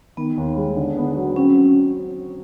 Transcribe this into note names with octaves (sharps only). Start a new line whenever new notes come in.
D#3 B3
D#2
G#3
D3
B3
F#3
C4 C#4